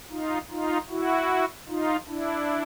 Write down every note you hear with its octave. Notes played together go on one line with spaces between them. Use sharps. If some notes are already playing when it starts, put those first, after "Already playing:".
D#4 F4
D#4 F4
E4 F#4
D#4 F4
D4 E4